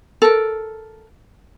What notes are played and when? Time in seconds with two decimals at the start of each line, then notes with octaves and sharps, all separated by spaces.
0.22 A4 A#4